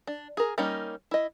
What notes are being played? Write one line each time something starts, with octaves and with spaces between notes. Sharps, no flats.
D4
G#4 A#4
G3 A#3 C#4 D#4
E4 D#5